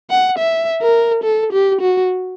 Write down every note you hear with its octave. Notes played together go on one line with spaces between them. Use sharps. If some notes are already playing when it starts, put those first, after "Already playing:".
F#5
E5
A#4
A4
G4
F#4